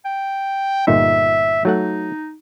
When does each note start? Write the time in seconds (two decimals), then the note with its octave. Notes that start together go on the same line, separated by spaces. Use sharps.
0.05 G5
0.87 G1 A#2 D#4 E5
1.65 F#3 A3 D#4 F#5